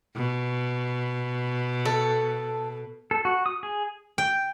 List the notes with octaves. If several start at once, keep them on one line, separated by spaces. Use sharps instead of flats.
B2
A4
A4
F#4
D#6
G#4
G5